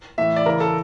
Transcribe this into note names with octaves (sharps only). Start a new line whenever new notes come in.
A2 E3 E5
D5
C#3 E3 A#4
A4